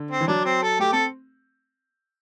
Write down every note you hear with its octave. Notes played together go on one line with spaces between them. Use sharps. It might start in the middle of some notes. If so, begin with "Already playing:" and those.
Already playing: D3
C4
E3
F#3 D4
C4
A4
A3 G4
C4 A4